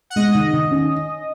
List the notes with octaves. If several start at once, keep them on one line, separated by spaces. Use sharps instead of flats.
F#5
G#3 D#5
D#3
D#3
C#4